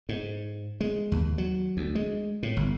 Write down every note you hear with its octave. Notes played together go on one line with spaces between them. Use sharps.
G#2
G#3
D#2
F#3
D2
G#3
A2
G1